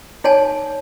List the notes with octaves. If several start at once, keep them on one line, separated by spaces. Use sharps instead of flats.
D#4 C#5 D5 G#5 A5